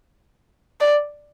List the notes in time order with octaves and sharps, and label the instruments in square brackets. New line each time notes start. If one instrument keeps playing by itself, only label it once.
[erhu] D5